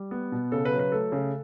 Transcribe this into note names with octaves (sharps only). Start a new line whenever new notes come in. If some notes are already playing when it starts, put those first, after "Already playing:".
Already playing: G3
B3
B2
C#3 A4
B4
F#3
B4
A3 A4
C#3